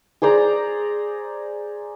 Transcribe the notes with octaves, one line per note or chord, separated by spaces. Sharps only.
G#4 C5 D5 A#5